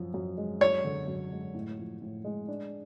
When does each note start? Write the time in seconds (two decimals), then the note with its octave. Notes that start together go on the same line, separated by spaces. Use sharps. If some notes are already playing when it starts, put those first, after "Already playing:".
Already playing: F#2 F3
0.14 F#2
0.38 G#3
0.61 F#2 C#5
0.84 D3
1.08 F#2
1.32 G#3
1.55 A2
1.79 F3
2.02 A2
2.25 G#3
2.48 D4